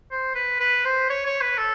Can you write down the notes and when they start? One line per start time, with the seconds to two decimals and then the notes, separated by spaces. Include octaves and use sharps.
0.11 C5
0.35 B4
0.60 B4
0.85 C5
1.10 C#5
1.26 C#5
1.41 B4
1.58 A4